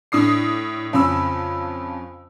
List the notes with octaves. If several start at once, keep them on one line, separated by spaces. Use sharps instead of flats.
A2 D4 D#6 C7
F2 C#3 C#4 B5 E6